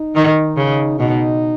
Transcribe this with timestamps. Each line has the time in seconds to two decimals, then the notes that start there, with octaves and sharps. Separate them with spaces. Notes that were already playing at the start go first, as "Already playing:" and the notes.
Already playing: D#4
0.15 D#3
0.57 C#3
0.99 B2 D#4